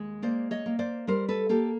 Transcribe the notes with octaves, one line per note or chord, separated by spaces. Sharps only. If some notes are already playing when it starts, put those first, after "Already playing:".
Already playing: D#2 G#3
A#3 C5 D5
C#5 D#5
A#3
C5 D5
G3 A#4 C5
A4 B4
A#3 G4 A4